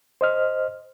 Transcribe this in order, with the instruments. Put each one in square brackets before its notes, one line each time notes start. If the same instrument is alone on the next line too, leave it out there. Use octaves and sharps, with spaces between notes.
[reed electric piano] C5 D#5 F6